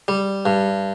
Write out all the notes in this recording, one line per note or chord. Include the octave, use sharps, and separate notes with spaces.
G3
G2